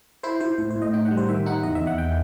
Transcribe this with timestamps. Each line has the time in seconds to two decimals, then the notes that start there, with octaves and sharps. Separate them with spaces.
0.23 E4 C5
0.40 E4 C5
0.58 A2 C5
0.70 C5
0.76 A2
0.82 D#5
0.93 D#4 G5
1.05 F#5
1.11 G3
1.17 C5
1.29 D#3 E5
1.46 D#4 F#5
1.63 E2 D#5
1.75 E5
1.81 E2
1.87 F#5
1.98 G5